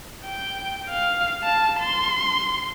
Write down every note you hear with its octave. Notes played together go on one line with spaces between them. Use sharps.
G5
F5
A5
C6